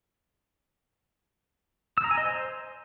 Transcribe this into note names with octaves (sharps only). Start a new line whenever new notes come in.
E6
A#5
G#5
D#5
C5